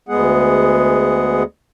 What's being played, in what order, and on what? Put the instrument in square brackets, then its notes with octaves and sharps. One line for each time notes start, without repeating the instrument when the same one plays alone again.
[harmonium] D2 G#3 B3 G#4 F#5